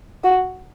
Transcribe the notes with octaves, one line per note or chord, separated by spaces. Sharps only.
F#4